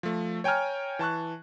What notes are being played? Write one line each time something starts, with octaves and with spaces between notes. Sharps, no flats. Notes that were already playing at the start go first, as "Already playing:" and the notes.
F3 A3
C#5 G5 G#5 A#5 F6
E3 A5 C#6 F#6